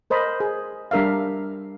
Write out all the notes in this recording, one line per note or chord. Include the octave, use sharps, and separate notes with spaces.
A#4 C5 D#5 B5
G#4
G3 D4 A#4 E5 F5